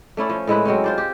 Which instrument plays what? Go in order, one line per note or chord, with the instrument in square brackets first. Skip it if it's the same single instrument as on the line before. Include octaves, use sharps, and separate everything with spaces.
[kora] A3 C#4 E4 D5
F3 C#4
A2 G#3 E4 B4
F#3 G#3 C4 C#4
F4 C5 D5
G4